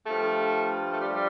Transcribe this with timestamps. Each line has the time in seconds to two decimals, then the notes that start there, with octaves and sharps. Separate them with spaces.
0.04 G2 F3 A3
0.92 A3
1.00 G3
1.14 G3